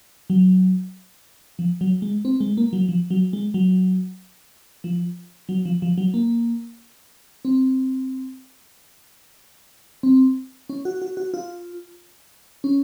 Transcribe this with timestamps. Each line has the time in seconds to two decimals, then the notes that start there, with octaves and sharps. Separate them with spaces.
0.30 F#3
1.59 F3
1.81 F#3
2.02 G#3
2.25 C4
2.40 G#3
2.57 A#3
2.73 F#3
2.89 F3
3.10 F#3
3.33 G#3
3.54 F#3
4.84 F3
5.49 F#3
5.65 F3
5.82 F3
5.98 F#3
6.14 A#3
7.45 C4
10.03 C4
10.69 C#4
10.85 F#4
11.02 F#4
11.17 F#4
11.34 F4
12.64 C#4